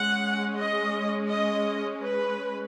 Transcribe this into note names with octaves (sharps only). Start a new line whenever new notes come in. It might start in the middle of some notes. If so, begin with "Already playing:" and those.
Already playing: G#3 C#4 F#5
D#5
D#5
B4